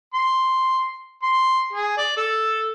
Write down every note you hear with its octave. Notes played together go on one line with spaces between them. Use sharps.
C6
C6
G#4
D5
A4